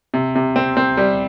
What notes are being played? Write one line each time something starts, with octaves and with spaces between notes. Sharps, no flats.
C3
C3
C4
C4
G3